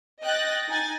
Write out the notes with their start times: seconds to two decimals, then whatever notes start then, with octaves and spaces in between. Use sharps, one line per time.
0.23 D#5 G5 F#6 A6 A#6
0.68 D#4 G#5 A6